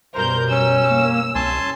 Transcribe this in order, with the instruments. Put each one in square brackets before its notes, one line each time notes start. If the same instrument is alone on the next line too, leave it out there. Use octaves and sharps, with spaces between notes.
[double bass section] F#2 B2 G3 [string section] A#4 G6 [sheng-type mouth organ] C5
[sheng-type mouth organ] C#4 [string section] E6
[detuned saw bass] A#3
[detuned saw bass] C2 [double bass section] C#4 [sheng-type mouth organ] G#5 A5 C6